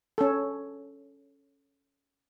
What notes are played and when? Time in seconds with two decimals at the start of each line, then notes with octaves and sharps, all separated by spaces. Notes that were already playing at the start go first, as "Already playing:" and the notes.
0.18 C#4 A4